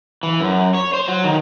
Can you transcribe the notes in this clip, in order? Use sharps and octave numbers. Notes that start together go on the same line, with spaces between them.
E3
F#2
C#5
C5
F#3
D#3